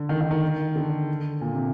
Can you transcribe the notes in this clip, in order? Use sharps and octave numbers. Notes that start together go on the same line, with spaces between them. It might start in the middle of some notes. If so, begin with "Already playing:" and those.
Already playing: D3
D#3
D#3
D#3
D3
A#2
C3